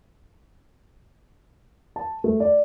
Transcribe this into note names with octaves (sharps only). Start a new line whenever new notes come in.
A5
A3
D5